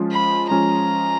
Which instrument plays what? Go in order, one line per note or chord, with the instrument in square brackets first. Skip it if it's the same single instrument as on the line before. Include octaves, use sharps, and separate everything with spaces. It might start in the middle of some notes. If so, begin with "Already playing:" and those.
Already playing: [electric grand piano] F3 G#3 C#4 F4
[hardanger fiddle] B5
[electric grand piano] F3 G#3 C#4 F4 [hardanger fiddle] A#5